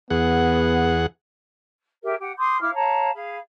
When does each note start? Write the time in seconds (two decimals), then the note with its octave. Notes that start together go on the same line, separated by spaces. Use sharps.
0.10 E2 B3 G#4 F#5
2.03 G4 G#4 A#4 E5
2.20 G4 F#5
2.37 C6 D6 D#6 G6
2.61 E4 F5 D6 F6
2.74 C#5 F5 A5 A#5
3.14 G#4 F5 B5